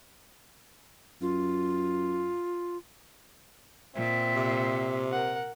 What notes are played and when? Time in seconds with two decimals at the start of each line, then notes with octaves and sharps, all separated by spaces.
1.22 F#2 F4
3.96 A#2 C4 E5
4.36 C3
5.12 A#4 F#5